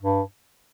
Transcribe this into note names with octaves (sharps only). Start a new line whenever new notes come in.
G2